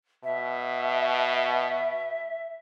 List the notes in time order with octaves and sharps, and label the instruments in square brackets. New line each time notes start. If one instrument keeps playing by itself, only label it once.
[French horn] B2 [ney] E5